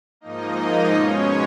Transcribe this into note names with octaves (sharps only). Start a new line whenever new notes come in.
G#2 F3 A#3 D#4 D#5
B2 G#3 C#4 C#5